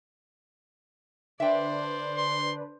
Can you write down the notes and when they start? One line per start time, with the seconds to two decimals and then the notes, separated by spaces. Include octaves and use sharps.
1.40 D3 D4 B4 C5 D5 E5 G5
2.18 C6